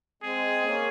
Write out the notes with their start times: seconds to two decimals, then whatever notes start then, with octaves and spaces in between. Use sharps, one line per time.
0.22 G#3 C4 G#4
0.62 A#3 C#4